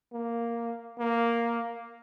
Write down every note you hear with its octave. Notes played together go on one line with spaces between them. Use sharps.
A#3
A#3